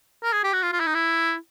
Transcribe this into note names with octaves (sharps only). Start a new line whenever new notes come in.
A#4
G#4
G4
F#4
F4
F4
E4
D#4
E4